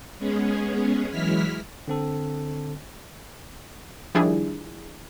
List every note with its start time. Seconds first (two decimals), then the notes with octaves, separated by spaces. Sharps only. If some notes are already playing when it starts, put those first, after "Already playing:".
0.18 G#3 B3 C#4 G#4
1.11 E3 F#3 G#3 E4 F6 B6
1.88 D3 C4 A4
4.15 D#3 F3 G3 D4 E4 G#4